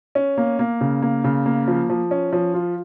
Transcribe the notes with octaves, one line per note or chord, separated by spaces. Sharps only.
C#4
A#3
A#3
C#3
A#3
C#3
A#3
F3
F3
C#4
F3
F4